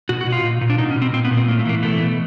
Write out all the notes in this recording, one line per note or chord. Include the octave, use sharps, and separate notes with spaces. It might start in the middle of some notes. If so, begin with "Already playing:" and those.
B2 F#4
F#4
B2
F4
A#2
A#2
D4
B2 D#4
C#4
B2
C4
A#2 C4
B3
A#2
C4
A2 A#3
A3
E3 A#3
B2 A3
B2